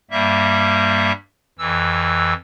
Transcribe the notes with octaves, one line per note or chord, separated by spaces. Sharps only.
G2 G3 A#3 E5
F2 E3 E6